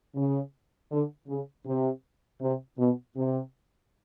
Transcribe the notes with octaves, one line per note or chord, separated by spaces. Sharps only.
C#3
D3
C#3
C3
C3
B2
C3